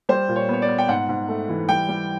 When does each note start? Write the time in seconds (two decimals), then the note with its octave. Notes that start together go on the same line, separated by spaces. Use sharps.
0.09 G3 C5
0.29 A#2
0.36 C#5
0.49 B3 C#5
0.62 D5
0.69 B3
0.78 G5
0.88 G#2 F#5
1.09 G#2
1.29 A3
1.49 E3
1.69 G3 G5
1.89 G3